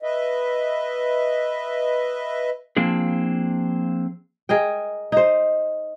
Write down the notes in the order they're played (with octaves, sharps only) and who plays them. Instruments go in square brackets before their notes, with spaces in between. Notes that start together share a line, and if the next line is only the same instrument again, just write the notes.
[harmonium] B4 D#5 E5
[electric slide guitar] F3 A#3 C4 D4 G#4
[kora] G#4 A#4 D#5 G5
D#4 C5